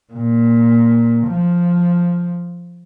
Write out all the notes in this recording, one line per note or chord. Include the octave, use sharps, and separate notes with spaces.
A#2
F3